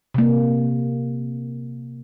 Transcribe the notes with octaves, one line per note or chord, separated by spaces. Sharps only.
C3 A#3